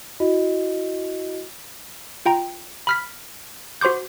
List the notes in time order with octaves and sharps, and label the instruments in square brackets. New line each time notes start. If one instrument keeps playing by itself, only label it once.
[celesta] E4 F#4 D#5
[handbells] F4 G5 A#5
B5 F6 B6
F#4 C5 C6 D6 G6